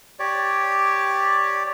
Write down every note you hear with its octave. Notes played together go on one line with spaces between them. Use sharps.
G4 C#5 D5